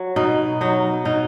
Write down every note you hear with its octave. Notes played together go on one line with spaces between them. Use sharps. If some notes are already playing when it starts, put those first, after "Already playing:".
Already playing: F#3
B2 D#4
F#3 D#4
B2 D#4